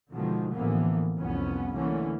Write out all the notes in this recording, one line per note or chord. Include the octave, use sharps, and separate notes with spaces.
B2 D3 D#3 F3 G#3
A1 D3 E3 F3 A#3 B3
C2 F2 B3 C#4
D3 E3 A3 A#3 C#4